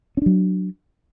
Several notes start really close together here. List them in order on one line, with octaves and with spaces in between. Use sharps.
C#4 D4 F#3